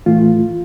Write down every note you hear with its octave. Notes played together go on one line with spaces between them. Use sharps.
A2 E3 A3 F4